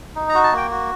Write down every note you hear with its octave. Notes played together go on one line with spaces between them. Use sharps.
D#4
A#5
F#4
A5
A#3 G5
F#4